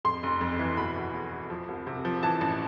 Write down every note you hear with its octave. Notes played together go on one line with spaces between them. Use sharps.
F2 C6
F1
F2
E3
B2 B5
E2
E2
E2
F3
C2
C3
F3
E3 A5
A1